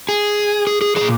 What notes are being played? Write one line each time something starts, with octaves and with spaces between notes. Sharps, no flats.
G#4
G#4
G#4
A#2 F3 G#4